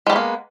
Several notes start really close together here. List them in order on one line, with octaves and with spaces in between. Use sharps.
G#3 G3 B3 A#3